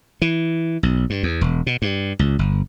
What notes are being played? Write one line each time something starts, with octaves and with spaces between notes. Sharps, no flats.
E3
B1
G2
E2
E1
B2
G2
C#2
G1